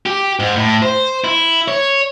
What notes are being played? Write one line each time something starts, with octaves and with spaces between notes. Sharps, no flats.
G4
G#2
A2
C5
E4
C#5